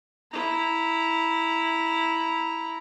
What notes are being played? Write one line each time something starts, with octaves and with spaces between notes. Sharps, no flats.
E4 A#5